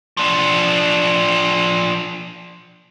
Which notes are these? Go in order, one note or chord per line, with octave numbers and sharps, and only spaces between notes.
F3 D4